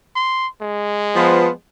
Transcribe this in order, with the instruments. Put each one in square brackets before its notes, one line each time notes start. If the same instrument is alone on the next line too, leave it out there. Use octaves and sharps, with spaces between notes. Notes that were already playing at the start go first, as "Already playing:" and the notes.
[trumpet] C6
G#3
[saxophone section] F3 B3